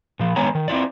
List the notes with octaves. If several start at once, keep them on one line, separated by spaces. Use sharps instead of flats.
A#2 F3
D#3 G#3 B3 C#5 G#5 A#5
D#3
C4 E4 F4 D5